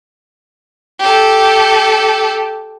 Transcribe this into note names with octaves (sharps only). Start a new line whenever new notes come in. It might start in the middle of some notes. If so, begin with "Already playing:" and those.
G4 A4